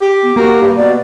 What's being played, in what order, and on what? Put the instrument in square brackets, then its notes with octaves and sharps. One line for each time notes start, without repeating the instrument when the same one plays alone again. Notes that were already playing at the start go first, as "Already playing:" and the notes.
[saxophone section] G4
[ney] B3
[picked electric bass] A#3 [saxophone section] F#4 A#4 [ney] G4
[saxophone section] G2
[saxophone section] B2 [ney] D5